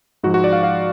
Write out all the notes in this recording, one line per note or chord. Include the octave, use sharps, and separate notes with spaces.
G#2 F3 F#4
F#4
D5
F5
F5